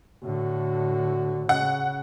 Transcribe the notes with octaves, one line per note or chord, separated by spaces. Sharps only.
A2 D3 F#4
C#3 F#5